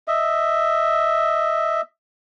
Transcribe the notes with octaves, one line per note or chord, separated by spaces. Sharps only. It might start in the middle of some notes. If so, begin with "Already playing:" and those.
D#5 E5